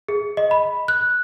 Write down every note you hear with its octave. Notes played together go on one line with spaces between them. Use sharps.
G#4
D#5
B5
F#6